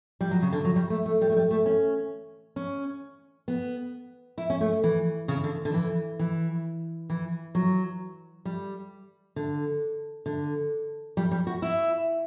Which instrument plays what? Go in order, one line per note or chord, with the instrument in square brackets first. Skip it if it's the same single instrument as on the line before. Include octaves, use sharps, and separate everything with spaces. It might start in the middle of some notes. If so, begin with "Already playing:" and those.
[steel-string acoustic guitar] G3
F#3
C#3
D3
F#3
G3
A3
A3
G3
A3
G3
A3
C#4
C#4
B3
E4
C#4
A3
E3
C#3
D3
D3
E3
E3
E3
F#3
G3
D3
D3
G3
G3
F#4
E4